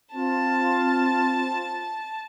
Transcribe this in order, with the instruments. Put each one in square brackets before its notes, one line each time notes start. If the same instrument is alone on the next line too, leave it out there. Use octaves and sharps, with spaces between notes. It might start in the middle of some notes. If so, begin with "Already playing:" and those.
[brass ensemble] C4 F4 [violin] A5